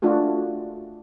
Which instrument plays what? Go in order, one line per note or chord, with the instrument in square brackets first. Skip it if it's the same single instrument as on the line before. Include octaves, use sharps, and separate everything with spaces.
[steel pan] A3 D4 F4 F#4 G#4